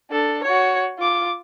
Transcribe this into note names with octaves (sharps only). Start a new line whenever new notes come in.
D4 A4
F#4 C#5
F4 D6